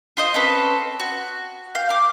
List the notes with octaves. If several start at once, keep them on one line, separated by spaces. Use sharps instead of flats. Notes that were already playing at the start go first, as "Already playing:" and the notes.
F4 C5 D#5
C4 C#4 A4 B4
F#4
F5 G6
D6 F6